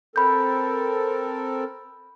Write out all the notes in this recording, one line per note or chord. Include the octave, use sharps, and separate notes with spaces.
C4 A4 A#4 B5 G6